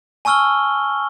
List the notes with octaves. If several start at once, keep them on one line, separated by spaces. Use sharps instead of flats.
G#5 A5 C#6 E6 F6 G7